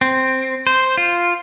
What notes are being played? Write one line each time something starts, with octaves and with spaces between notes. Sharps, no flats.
C4
C5
F4